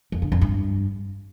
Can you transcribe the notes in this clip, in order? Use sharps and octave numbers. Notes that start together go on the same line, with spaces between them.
F2
D3
F2
G2